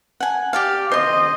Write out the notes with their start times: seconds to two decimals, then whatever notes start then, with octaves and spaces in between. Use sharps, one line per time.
0.20 F#5 G#5
0.53 G4 D5 F5
0.92 C5 D#5 C6